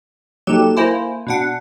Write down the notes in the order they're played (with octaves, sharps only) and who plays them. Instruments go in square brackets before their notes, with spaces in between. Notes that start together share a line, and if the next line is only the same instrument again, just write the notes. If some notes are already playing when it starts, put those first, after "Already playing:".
[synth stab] F#3 G4 E7 [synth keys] A#3 D#4 A4
[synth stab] A#3 E4 C5 [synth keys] G#5
[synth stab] B2 D4 F#5